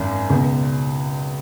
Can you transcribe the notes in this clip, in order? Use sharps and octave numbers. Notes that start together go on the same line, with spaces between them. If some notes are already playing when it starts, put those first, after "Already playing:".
Already playing: G#1 F#2 D#3
C#2 B2